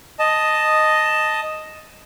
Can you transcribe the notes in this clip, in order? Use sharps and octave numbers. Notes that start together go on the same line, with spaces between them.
D#5 A5